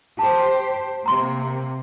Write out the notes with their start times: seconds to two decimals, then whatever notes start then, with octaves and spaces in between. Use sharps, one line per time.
0.19 G4 C5 A5
1.06 C3 A#3 A#5 C6